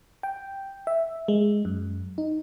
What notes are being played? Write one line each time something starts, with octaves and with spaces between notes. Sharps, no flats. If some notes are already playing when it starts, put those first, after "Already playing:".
G5
E5
G#3
F#2
D#4